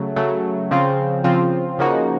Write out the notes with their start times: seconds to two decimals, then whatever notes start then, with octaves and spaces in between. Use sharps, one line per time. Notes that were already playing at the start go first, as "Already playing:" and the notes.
Already playing: C#3 F#3 A3
0.16 C#3 F#3 A3
0.71 C#3 F3 C4 F4
1.24 C#3 F3 C4 F4
1.79 C#3 F3 A#3 D#4 F#4